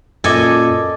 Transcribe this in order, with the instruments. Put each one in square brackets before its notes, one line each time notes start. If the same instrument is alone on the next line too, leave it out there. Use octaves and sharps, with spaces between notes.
[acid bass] F#2 [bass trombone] A#2 [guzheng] A4 G#5 [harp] D#5 D6 G#6